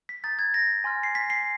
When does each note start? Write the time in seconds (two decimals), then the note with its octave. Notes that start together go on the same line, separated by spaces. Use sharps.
0.09 B6
0.24 A#5 D#6 G6 A6
0.39 G#6
0.54 A#6
0.84 G#5 C6 F6
1.03 C7
1.15 B6
1.30 C7